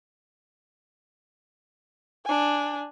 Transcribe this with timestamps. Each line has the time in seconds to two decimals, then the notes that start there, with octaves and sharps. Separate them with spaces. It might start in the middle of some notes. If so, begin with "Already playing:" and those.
2.25 D4 G#5